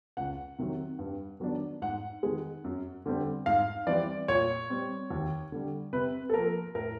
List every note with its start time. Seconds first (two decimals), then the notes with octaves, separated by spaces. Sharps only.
0.17 C#2 F#5
0.59 C3 D#3 F#3
0.99 G2
1.40 D#3 F#3 B3 D4
1.82 G#2 F#5
2.23 D#3 G#3
2.64 F#2
3.06 D3 G3 C4
3.46 G#2 F5
3.87 E3 G3 C4 D5
4.28 A#2 C#5
4.70 G3 C4
5.10 D#2
5.52 D3 G3
5.93 C3 B4
6.30 A4
6.34 F3 A#3 A#4
6.75 A2 A#4